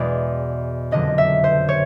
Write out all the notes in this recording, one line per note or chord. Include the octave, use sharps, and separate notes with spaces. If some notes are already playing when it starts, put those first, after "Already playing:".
Already playing: E2 B2 G#3 D5
F#1 F2 D3 F#3 D#5
E5
C5
C#5